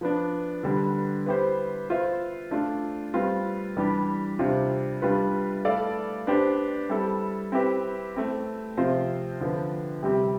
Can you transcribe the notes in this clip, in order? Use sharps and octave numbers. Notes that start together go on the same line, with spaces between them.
F3 B3 D4
D3 G3 B3
B3 E4 G4 C5
B3 F4 C5 E5
A3 D4 F4
G3 C4 F4 B4
E3 G3 D4 G4
C3 G3 D4 F4
G3 D4 F4 B4
A3 E4 A4 D5 F5
B3 D4 G4 C5
G3 C4 E4 A4
C4 E4 G4 B4
A3 C4 E4
C3 F3 C4 F4 C5
D3 F3 B3
C3 G3 C4 G4